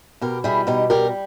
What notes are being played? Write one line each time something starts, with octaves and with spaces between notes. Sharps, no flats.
B2 G4 A#4
G3 E4 G#4
B2 D#4 G4
G3 G4 A#4